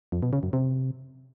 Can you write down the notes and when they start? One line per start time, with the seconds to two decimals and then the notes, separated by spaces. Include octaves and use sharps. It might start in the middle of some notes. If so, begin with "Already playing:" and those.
0.12 F2
0.23 B2
0.33 C#3
0.43 F#2
0.53 C3